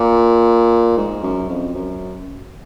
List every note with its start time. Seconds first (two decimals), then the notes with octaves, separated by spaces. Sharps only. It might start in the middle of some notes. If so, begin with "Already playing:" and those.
Already playing: A#2
0.97 G#2
1.23 F#2
1.49 F2
1.75 F#2